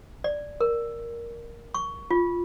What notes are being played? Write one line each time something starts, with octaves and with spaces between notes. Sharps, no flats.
D5
A#4
C#6
F4